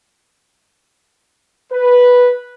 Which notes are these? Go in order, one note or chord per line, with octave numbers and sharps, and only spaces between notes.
B4